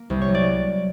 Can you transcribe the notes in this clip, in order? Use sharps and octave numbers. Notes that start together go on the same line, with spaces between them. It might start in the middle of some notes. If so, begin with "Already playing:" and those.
Already playing: A#3
C2
C#5
F#3
D5